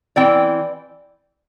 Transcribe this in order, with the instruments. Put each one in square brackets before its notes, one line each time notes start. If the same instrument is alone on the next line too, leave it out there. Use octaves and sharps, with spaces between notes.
[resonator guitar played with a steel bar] E3 C4 D5 G5